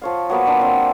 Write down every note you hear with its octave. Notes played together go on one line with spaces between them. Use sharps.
F3 C#5 F5
F#3 A#3 B3
A#2 D4 C6
F#3 C4